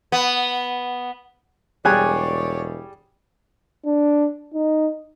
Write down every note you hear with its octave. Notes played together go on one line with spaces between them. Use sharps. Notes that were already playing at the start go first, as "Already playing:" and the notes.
B3
E1 G3 G#4 C#5 D5 G#5 F#6
D4
D#4